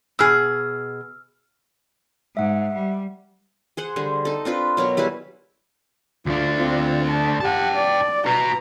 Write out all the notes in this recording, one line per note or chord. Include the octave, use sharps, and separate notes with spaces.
B2 G#4 E6 F6
G#2 E5 F#5
G3
G#4 C5 F#5
D3 G3 G#4 C5
D#4 A4
C4 D4 F4 B4
B2 F#3 A#4 C#5
G3 E4 G#4 B4
D2 D4 F4
C4 F4
A5
G4 F#5 G5 A5
D5
F#4 B4 A#5